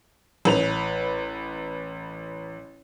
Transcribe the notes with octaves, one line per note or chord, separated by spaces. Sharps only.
A1 B4 F7